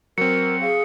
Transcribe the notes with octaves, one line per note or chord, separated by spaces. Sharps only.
F#3 C4 A#4 C#7
G#4 F5